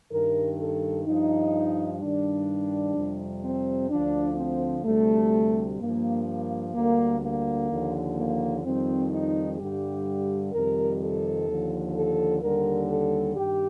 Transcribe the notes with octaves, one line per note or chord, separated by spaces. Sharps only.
G2 D#3 G3 A#4
A4
G2 F3 D#4
G2 D#3 G3 D4
F2 C3 G3
C4
D2 D3 F3 D4
C4
D2 C3 G3 A3
G2 F3 A#3
A#3
D2 D3 G3 A#3
A#3
D#2 D3 F3
A#3
F2 D#3 G3 C4
D#4
G2 D3 G3 G4
F2 C3 D#3 G3 A#4
A4
D#2 D3 F3
A4
D#2 D3 G3 A#4
A4
G2 D#3 G4